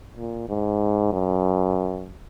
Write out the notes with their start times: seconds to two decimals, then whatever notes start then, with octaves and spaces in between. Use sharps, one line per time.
0.16 A#2
0.49 G#2
1.12 F#2